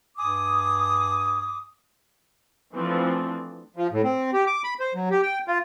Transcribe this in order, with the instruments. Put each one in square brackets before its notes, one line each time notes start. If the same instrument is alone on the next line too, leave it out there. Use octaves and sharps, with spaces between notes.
[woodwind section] G2 G#5 D6 D#6
[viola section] E3 F3 A3 C4 D4
[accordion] F3
A2
C4
G4
D6
B5
C5
F#3
G4
G5
F4